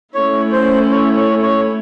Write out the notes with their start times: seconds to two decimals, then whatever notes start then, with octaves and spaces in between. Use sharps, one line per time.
0.14 A3 C#4 E4 C#5
0.52 C5
0.91 C#5
1.17 C#5
1.43 C#5